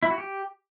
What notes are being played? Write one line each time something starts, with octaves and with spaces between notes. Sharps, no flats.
E4
F#4
G4